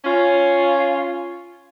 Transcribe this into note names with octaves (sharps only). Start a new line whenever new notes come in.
C#4 F4